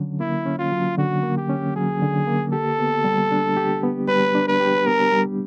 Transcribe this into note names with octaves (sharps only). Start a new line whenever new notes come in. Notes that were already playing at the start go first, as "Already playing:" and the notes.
Already playing: D3 F#3 C#4
A#3 E4
C#4
F4
F#3
D3 F#4
A#3
G4
C#4
F#3 G#4
D3
A#3
G4 A4
B3
G3
D4
G4
B3
G3 B4
D4
B4
G4
B3 A#4
G3